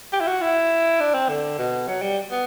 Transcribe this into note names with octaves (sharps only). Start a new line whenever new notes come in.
G4
E4
F#4
E4
D4
C4
D3
B2
F#3
G3
B3